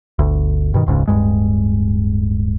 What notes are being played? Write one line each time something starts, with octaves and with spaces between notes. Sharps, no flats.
G1 D2
G2 B2 D#3
E1 C#2 G#2 C#3
D1 G2 G#3